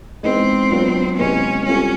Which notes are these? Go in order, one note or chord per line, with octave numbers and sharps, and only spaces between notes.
E3 G#3 B3 C4 D#4
F#3 B3 D4 F4
C3 E3 G#3 B3 C#4
G3 C4 C#4 F4 A4